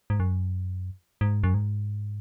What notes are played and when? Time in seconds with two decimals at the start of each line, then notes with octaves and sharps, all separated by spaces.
0.10 G#2
0.20 F#2
1.21 G#2
1.43 F#2
1.54 G#2